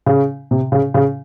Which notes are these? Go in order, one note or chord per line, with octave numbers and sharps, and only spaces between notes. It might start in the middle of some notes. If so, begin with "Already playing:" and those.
C#3
C3
C#3
C#3